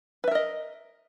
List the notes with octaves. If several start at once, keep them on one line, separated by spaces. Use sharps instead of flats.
A#4 B4 D#5 E5